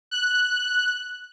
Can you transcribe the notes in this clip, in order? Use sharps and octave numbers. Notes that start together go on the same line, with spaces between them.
F#6